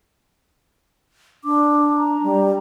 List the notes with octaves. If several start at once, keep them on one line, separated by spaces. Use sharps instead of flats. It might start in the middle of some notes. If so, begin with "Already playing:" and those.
D4 D6
A#5
G3